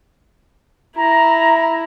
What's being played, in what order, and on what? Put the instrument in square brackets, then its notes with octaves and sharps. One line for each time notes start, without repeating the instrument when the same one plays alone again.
[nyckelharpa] E4 [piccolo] A#5